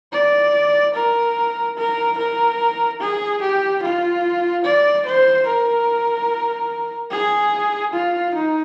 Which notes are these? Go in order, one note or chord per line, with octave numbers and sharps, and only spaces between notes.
D5
A#4
A#4
A#4
G#4
G4
F4
D5
C5
A#4
G#4
F4
D#4